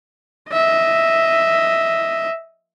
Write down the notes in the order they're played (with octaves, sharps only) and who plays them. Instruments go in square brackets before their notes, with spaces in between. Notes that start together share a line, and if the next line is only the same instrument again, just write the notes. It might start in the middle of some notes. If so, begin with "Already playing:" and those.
[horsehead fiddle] D#5 E5